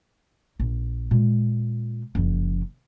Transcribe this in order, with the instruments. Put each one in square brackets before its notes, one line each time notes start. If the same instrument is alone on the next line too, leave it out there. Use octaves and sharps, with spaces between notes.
[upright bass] A#1
A#2 G#3
F#1 F3